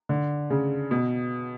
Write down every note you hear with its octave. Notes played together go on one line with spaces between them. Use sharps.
D3
C#3
B2